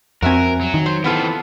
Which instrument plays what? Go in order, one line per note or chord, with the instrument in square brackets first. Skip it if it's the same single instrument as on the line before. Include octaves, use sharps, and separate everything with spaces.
[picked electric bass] F2 C4 [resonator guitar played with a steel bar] F#4 E5 G#5 [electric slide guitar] A#4
[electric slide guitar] F#3
[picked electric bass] D#3
[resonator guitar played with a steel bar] C5
[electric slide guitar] E3 C4 [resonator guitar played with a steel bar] B3 F4 A4